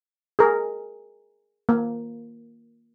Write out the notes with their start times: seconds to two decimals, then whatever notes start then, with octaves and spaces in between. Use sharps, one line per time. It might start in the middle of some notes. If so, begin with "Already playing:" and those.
0.39 G#4 A#4
1.69 A#3